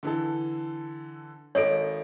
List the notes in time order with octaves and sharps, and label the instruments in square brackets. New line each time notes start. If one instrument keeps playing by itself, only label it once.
[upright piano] D3 E3 A4
[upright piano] G#1 D#5 D7 [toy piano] A4 C#5